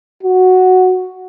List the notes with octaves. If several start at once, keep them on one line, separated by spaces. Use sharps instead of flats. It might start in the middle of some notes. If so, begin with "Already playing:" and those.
F#4